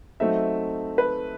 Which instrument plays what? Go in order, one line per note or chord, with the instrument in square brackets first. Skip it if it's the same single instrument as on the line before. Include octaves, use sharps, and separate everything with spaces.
[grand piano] F#3 A3 C4 D#4 [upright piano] E5
[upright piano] B4